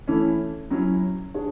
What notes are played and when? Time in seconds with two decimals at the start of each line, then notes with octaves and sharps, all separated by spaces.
0.07 E3 A3 C#4 E4
0.70 F#3 C#4 E4
1.34 D4 G#4 C#5